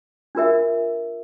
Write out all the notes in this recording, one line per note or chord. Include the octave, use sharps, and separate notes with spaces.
D4 F4 A#4 E5